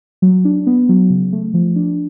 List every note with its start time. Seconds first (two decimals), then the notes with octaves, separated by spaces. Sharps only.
0.22 F#3
0.45 D4
0.67 B3
0.89 F#3
1.10 C#3
1.33 A3
1.54 F3
1.76 D4